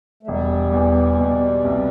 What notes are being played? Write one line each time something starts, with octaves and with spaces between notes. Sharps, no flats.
A3
E1 G3
E2
B2
C2